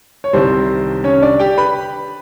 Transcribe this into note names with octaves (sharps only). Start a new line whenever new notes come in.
C#5
C2 C3 D#3 G3 C4 C5
C#4 C#5
D4 D5
G4 G5
B4 B5